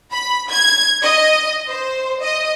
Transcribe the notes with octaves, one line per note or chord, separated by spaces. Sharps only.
B5
G#6
D#5
C5
D#5